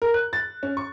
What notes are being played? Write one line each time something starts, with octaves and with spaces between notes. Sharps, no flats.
A#4
F#6
A6
C#4
C#6